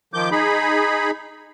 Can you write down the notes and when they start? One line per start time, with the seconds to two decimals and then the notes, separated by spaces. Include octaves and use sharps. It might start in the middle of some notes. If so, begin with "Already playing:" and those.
0.14 D#3 F3 D6 G6
0.31 D#4 G#4 B5